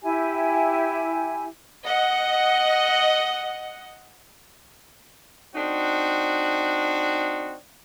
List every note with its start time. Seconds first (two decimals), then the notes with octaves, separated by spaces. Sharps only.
0.02 E4 G4 G#5
1.84 D#5 F#5
5.55 C4 D4 D#4 F#4